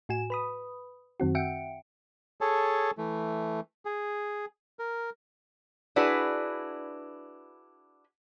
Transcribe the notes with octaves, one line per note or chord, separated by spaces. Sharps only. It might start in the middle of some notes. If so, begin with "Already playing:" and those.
A2 F#4 G#5 E7
B4 B5 D#6
F#2 D#3 C4 F#4
E5 F#5 G5 C#7 D7
G#4 A4 C#5 A5
E3 A3
G#4
A#4
D4 E4 F#4 G#4 B4